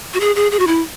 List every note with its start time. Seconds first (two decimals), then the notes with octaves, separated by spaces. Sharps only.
0.14 F#4
0.20 G#4
0.36 G#4
0.52 G#4
0.59 F#4
0.67 E4